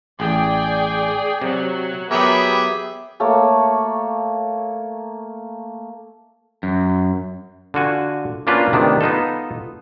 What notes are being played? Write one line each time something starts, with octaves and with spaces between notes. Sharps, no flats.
A1 G#4 D5 G5
C3 F#3
F#3 B3 G4 G#4 A#4 E5
A3 A#3 A4 C#5
F#2
D3 F4 F#4 G#5
A#3 C#4 D4 F4 F#4 B4
C3 D#3 A3 B3 D4
B3 D#4 F4 A4